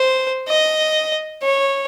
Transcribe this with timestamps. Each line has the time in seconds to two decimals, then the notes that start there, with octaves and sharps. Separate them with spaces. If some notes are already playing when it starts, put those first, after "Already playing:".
Already playing: C5
0.48 D#5
1.43 C#5